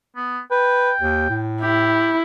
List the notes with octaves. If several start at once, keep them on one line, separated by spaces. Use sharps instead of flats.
B3
B4 G5
D#2
A2
E4 G4